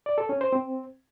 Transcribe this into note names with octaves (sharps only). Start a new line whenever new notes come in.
D5
A4
C#4
C5
C4